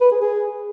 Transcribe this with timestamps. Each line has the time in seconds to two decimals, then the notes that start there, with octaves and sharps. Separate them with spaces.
0.01 B4
0.11 G#4
0.22 G#4